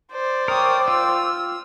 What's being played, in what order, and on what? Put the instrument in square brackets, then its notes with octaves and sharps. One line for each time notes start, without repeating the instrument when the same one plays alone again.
[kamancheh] C5 D5
[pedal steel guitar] A#4 C#5 [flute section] G5 D6 [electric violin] D#6
[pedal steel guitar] F4 [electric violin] E6